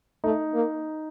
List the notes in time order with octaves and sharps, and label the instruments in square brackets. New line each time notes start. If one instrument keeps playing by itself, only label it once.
[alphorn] A3 [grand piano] D#4
[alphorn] A#3